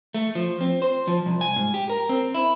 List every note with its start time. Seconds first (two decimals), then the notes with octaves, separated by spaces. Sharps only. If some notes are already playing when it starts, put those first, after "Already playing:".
0.14 A3
0.35 F3
0.61 C4
0.82 C5
1.08 F3
1.26 C2
1.41 G#5
1.56 G#2
1.74 G4
1.90 A#4
2.09 C4
2.35 E4